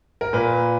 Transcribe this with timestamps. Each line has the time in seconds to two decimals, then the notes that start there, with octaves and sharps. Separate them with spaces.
0.21 A#4
0.33 A#2 B4